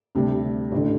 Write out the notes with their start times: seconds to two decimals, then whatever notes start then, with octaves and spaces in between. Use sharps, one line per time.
0.15 D2 C3 G3 D4
0.72 A1 D3